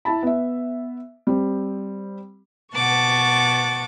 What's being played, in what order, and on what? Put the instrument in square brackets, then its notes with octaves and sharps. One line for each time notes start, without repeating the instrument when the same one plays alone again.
[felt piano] E4 A5 B5
B3 E5
G3 C4
[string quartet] B2 F#5 A5 C#6 D6 A6